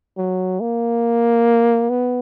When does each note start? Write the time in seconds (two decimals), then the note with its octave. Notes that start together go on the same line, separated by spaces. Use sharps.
0.18 F#3
0.60 A#3
1.90 B3